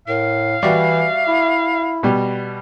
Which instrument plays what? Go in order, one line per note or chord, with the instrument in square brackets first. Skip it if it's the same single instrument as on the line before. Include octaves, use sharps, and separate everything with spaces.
[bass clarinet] A2 [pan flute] A#4 [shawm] F5
[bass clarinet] E3 [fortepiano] G3 F#4 D5 [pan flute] E5
[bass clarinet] E4
[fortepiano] B2 G3